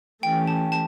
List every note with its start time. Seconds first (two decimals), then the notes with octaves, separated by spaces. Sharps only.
0.23 E3 A3 C#4 G4 G5
0.47 A5
0.72 A5